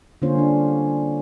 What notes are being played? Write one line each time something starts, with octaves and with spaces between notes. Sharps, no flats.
D3 A#3 C#4 F4 C5 C#5
G3 D4